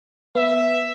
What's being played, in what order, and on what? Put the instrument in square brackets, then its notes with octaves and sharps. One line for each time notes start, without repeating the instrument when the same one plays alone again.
[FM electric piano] B3 [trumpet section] E5